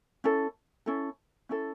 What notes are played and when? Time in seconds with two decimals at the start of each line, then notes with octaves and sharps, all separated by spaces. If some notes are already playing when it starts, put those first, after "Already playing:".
0.24 C#4 E4 A4
0.86 C#4 E4 A4
1.49 C#4 E4 A4